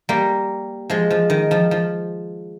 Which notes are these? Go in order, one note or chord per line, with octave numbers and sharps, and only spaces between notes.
G3 A#3
F3 G#3
F3
D#3
F3
F3